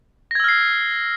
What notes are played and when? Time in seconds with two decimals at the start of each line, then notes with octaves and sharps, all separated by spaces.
0.31 A#6
0.35 G#6
0.40 E6
0.44 F6
0.48 C7